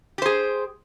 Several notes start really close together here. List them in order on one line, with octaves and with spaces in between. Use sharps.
G4 C5 G#4